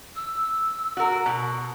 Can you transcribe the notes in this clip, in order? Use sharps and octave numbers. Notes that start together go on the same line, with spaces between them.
E6
F#4 A#4
B2